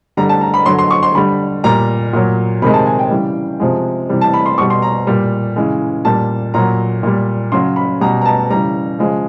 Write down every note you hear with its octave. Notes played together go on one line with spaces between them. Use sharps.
D3 G3 A#5
A5
A#5
B5
D3 F#3 C6
C6
C#6
C6
D3 G3 B5
A#2 G3 A#5
A#2 F#3
C3 D#3 G#3 B5
A5
G#5
G5
C#3 E3 G3
C3 F3 G#3
C3 E3 G3
A5
B5
C6
B2 G3 C#6
C6
A#5
A#2 G3
C#3 E3 G#3
A#2 G3 A5
A#2 F#3 A#5
A#2 G3
C#3 F#3 C6
B5
B2 G3 A#5
A#5
A5
C#3 E3 G3 A#5
C#3 F3 G#3